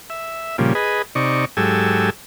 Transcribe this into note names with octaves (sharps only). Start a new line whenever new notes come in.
E5
A#2 C#3 F3 G3
G#4 B4 D#5
C3 D#4 D5 C#6
G#2 F#3 G4 A4 G#5 E6